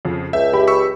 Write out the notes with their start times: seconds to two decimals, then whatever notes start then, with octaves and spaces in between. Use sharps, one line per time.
0.05 F2 C#3
0.33 C#2 E5 G6
0.53 G4 B5
0.67 C#6 E6 B6